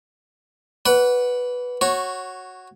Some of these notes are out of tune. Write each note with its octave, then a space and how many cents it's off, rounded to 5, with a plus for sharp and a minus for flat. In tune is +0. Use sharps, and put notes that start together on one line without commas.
B4 +0 D5 -40 F#5 +0
F#4 +0 C#5 -15